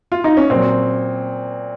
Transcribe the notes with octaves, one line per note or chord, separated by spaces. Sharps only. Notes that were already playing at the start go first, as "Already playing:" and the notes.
F4
D#4
C#4
A#2 F#3 C4